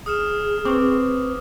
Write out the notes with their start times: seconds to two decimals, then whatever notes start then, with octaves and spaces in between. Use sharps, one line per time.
0.06 G#4 D#6 F6 E7
0.65 C4 B4 C#6 D6